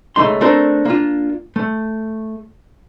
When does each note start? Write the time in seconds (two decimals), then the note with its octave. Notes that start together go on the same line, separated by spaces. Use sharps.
0.16 C#2 F#2 A3 D#4 C6
0.41 A3 C4 D4 A4 A#4 C5
0.85 A#3 D4 F4
1.56 A3